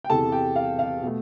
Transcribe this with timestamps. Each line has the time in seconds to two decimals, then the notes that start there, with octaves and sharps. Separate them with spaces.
0.04 G5
0.10 E2 C3 E3 A4 A5
0.32 G4 G5
0.56 F5
0.79 F5
1.03 B2 A3